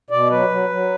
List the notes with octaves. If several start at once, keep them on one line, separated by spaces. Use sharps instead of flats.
B2 D5
F#3 B4
F#3
F#3